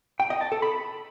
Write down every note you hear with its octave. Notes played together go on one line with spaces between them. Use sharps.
G5
D#5
A5
A4
B5